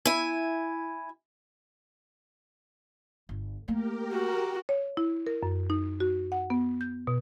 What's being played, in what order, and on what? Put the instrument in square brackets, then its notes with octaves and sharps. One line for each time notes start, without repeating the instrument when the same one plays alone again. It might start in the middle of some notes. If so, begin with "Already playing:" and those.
[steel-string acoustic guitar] E4 G#5
[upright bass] G1
[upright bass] A3 A#3 [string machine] G4 A#4
[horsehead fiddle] F#4
[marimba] C#5
E4
A#4
F#2
D#4
F#4
F#5
B3
G6
B2